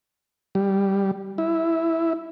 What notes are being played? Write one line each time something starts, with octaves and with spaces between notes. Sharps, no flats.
G3
E4